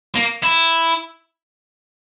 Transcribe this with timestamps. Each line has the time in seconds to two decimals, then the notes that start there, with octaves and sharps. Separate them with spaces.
0.15 A#3
0.43 E4